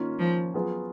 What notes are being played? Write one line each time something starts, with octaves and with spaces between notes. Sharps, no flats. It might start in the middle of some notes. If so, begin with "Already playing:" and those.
Already playing: D#3 A#3 C#4 F4
F3
F#3 B3 F4 G#4